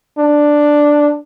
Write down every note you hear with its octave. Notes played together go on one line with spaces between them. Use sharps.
D4